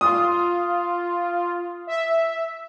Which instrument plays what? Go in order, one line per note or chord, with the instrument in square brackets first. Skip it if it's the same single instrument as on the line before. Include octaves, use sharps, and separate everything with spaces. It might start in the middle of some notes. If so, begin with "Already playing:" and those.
[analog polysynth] F4 [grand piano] D#6
[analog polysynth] E5